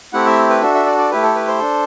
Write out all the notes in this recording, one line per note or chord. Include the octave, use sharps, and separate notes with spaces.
A3 C4 E4 G4 F#5
E5
B4
D4 F#4 A4 E5
E5
D5
D5
A3 E4 G4 B4
A4
B4
C5
D4 A4